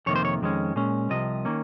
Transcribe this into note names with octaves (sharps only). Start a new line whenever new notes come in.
F2 C3 D#3 A#3 C#5
C5
C#5
F2 D#3 G#3 C#4
A#2 G#3 C#4
C2 C3 F3 D#5
D#3 A#3 C#4